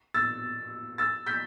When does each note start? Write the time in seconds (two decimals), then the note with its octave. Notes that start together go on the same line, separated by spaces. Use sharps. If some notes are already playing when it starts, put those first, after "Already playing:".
0.14 E6 A6
0.98 E6 A6
1.26 G6 B6